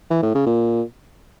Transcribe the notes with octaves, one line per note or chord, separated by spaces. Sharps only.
E3
A2
C#3
A#2